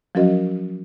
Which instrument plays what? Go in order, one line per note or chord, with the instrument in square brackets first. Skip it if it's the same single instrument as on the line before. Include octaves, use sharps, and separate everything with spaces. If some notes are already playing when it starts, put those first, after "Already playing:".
[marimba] F3 F#3 C#4 F#4 A#4 D#5